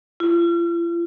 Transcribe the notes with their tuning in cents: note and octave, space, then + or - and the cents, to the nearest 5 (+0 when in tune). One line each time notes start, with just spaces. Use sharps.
F4 -40